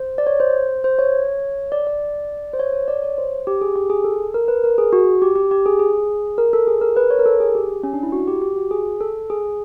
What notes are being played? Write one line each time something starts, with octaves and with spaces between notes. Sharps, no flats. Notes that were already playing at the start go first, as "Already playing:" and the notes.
Already playing: C5
D5
C#5
C5
C5
C#5
D5
D5
C5
C#5
C#5
D5
C#5
C5
G4
G#4
G4
G#4
A4
A#4
B4
A#4
G#4
F#4
G4
G4
G4
G#4
G#4
A#4
A4
G#4
A#4
B4
C#5
A#4
A4
G#4
G4
C#4
D4
E4
F#4
G4
G4
F#4
G#4
A4
G#4